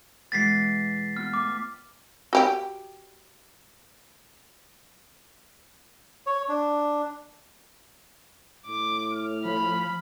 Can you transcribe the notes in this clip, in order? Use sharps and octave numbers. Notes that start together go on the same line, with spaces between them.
B2 E3 G#3 A6 B6 C7
B3 F4 F6
A2 D6
F#4 G4 G5
C#5
D4
A2 D6
F6
F3 B5